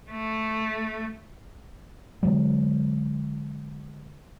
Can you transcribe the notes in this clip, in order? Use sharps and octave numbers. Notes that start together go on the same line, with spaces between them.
A3
D3 D#3 F#3 G#3